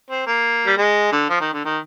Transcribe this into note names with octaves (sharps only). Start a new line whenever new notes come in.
C4
A#3
G3
G#3
D3
F3
D#3
D3
D#3